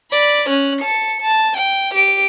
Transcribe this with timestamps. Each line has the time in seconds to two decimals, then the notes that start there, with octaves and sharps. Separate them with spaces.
0.12 D5 B5
0.49 C#4 F#6
0.81 A5 C#7
1.21 A5
1.57 G5
1.94 G4 D7